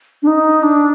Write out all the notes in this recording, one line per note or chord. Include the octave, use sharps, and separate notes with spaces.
D4
D#4
D4